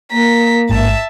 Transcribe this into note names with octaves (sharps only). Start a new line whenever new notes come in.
A#3 A#5 B6
A1 G#2 E5 A5